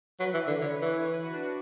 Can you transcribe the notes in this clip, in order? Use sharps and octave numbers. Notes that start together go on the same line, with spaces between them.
F#3 B4
E3
D3
D3 C#5
E3
C#5
B4
F#4
D4
F#4